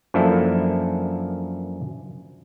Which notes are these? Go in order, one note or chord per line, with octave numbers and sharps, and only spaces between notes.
F#2 F3 A#3 D4 E4 A4